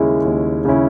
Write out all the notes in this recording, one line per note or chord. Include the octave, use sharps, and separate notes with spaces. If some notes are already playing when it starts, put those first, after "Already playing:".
Already playing: D#2 C#3 G#3 C#4 E4
D#2
C#3 G#3 C#4 E4